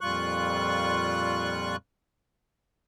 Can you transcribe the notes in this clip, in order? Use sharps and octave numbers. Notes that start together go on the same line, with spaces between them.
F2 A#2 G3 F4 C#6 F#6